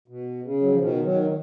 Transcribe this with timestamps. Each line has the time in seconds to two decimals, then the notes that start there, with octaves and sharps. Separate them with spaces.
0.08 B2
0.43 C#3
0.61 F#3
0.70 F3
0.80 B2 D#3
1.04 D#3 F#3
1.24 F#3